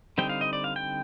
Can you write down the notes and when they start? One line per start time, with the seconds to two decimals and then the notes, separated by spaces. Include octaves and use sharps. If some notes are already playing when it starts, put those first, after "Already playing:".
0.18 D3 G3 C4 D#4 G5
0.29 F5
0.41 D#5
0.53 D5
0.64 F5
0.76 G5